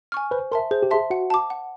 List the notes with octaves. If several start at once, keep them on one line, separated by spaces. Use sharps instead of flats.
G#5 C#6 F6
B4 C5
A#4 E5 A5 C6
G#4 C5
G4
G#4 E5 A5 C6
F#4 F#5
A5 D6
F#5